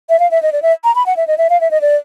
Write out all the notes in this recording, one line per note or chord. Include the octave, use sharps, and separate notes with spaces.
E5
F5
E5
D#5
D5
E5
A#5
B5
F#5
E5
D#5
E5
F5
E5
D#5
D5